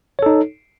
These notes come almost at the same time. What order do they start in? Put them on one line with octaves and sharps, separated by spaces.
C#5 A4 D#4